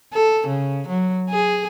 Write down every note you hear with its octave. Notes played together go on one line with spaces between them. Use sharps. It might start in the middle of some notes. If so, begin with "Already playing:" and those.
A4
C#3
F#3
G#4